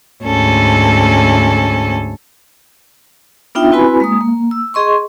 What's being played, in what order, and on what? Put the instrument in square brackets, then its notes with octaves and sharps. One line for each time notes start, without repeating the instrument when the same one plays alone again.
[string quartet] D2 G#2 C#4 A4
[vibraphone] B3 D4 D#4 F4 E5 G5
C4 E4 F#4 B4 G#5 B5
G#3 A#3 D#6
A#3
E6
G#4 D#5 C6 C#6